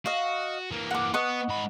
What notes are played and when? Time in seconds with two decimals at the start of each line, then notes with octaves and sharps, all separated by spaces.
0.06 F#4 D#5 F5
0.71 E3 A#3
0.91 F#5 D6
1.14 B3 D#5 F#5 C#6
1.49 G#2 B5